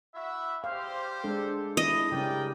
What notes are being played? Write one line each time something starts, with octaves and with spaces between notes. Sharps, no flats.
E4 F#4 E5
G3 G4 C5 F5
G#3 D4 A4
E4 D#5
C#3 G3 C#4 A#4 D5 G5